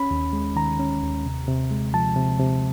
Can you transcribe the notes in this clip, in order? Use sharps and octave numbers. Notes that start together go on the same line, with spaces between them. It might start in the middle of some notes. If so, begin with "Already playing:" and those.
Already playing: C#4 B5
D#2
G#3
D#3 A#5
C#4
D#2
C3
C3
G#3
F3 A5
C3
C3